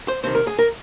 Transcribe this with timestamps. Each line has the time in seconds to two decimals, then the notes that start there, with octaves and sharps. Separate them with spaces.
0.08 C5
0.23 C2 C3 D#3 C5
0.35 A#4
0.47 G#4
0.59 A#4